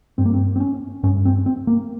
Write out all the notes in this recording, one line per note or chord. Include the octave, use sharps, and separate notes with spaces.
G2 C4
A#3
C4
C4
C#4
G2 C#4
C4
C4
A#3